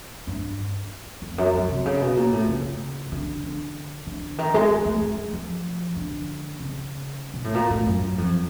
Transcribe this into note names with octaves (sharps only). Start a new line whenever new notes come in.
G2
F2
F#2
F#2
C3
C#3
B2
A#2
A2
C#3
D3
D3
D3
D#3
G#3
G#3
A3
G#3
F3
D3
C#3
B2
A2
A#2
A2
F#2
F2